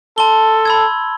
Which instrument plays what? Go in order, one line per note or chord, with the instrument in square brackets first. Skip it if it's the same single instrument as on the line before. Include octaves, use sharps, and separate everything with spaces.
[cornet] A4 [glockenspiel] A5 C6 G7
[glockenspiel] B5 E6 G#6